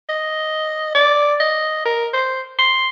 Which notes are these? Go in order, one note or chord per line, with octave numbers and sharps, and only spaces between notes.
D#5
D5
D#5
A#4
C5
C6